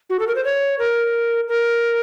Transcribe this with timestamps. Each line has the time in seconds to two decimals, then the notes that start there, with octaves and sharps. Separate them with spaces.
0.10 F#4
0.19 A4
0.27 A#4
0.35 C5
0.44 C#5
0.79 A#4
1.48 A#4